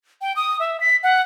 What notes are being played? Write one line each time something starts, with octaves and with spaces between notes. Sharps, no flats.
G5
D#6
E5
B6
F#5